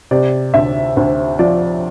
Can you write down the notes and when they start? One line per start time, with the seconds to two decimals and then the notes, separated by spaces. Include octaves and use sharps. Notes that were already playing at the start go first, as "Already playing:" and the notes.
0.11 C3 D5
0.54 D2 E5
0.97 D2 C5
1.39 F3 D5